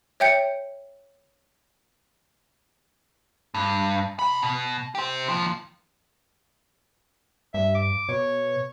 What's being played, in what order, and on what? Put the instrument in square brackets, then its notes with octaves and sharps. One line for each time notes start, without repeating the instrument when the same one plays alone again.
[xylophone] C#5 E5 G5 G6 C#7
[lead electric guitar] G2
C3 B5
B2
G4 C5
D#2 F3
[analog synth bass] G2 [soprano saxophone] E5
[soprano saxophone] D6
[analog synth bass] B2 [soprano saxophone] C#5